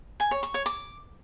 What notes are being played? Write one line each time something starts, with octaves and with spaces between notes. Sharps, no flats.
G#5
C#5
C#6
C#5
D6